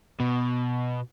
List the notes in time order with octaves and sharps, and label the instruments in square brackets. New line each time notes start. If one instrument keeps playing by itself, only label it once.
[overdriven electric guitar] B2